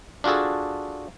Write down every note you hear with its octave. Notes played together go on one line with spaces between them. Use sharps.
D4 F4 F#4 G#4 A4